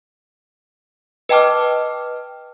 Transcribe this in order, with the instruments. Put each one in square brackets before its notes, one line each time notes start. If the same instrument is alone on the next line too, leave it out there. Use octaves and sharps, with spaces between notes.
[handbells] B4 D#5 G5 A5 D6 F6